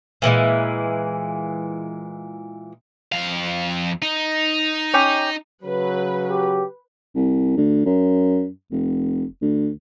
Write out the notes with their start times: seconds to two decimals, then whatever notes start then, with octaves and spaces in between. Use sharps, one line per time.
0.22 A#2 E3 F3 G#3
3.12 F2 F5
4.02 D#4
4.94 C#4 G4
5.64 C#3 F#3 B4
6.29 G4
7.15 C2
7.57 D2
7.85 F#2
8.71 F1
9.42 D2